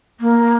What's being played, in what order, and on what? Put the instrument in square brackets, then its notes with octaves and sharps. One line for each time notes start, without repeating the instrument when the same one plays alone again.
[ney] A#3